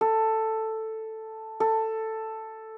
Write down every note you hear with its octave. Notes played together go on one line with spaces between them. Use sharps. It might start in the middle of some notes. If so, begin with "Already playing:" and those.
A4
A4